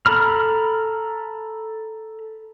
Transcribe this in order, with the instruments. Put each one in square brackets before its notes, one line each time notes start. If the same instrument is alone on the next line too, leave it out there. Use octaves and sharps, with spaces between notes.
[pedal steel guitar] A4 A#5 B5 F6